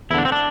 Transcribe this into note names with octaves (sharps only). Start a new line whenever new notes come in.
E2 D3 D4 E4
C4
D4